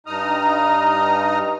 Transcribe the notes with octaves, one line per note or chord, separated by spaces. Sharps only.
G2 D#4 A#5 D#6 F6